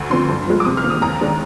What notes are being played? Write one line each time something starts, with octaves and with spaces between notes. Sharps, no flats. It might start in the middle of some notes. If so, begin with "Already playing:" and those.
Already playing: D2
D3 F3 C4 C6
G2
F3 G#3
D6
C3 D#6
F6
D#3 A#3
D#6
D#2 A#5
D#3 G#3 D4